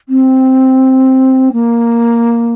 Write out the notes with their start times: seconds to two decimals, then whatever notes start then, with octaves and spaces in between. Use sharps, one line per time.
0.09 C4
1.52 A#3